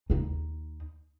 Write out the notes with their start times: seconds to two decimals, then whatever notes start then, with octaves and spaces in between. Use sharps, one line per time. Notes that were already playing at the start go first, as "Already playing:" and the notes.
0.10 D#2 D#4